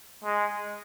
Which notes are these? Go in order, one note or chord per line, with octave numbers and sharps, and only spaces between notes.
G#3